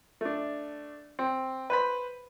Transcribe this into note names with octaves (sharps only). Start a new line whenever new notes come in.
A3 D4
C4
B4 C5 B5